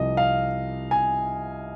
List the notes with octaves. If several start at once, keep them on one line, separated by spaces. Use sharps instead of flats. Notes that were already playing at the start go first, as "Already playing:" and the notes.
Already playing: C2 C3 F3 D#5
F5
G#5